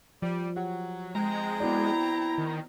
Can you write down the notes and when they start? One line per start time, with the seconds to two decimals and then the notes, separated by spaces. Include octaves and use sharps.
0.22 F3 G3
0.56 F#3 G4 F#5
1.15 G#3 C4 G5 A#5
1.60 B3 E4 F#4 D5
2.38 D#3